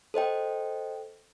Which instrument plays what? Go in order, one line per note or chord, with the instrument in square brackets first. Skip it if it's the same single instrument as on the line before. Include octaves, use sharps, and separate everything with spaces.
[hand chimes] A4 C5 D#5 G5